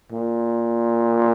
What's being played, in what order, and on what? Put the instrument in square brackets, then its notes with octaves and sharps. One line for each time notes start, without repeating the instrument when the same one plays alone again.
[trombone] A#2